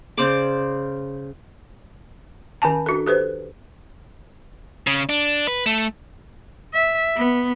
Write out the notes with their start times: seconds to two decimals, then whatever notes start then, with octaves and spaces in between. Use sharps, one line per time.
0.17 C#3 C5 D5 D6
2.62 D#3 C#4 G#5 A5
2.86 D4 F#4 A4
3.06 G4 A4 B4 C5
4.87 C#3
5.09 D4
5.47 B4
5.66 A3
6.74 E5
7.17 B3